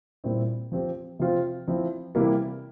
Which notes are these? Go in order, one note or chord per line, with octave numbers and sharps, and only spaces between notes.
A#2 G3 C4 E4
F3 C4 G4
C3 F3 C4 F4
F3 C4 E4
C3 E3 G3 A#3 E4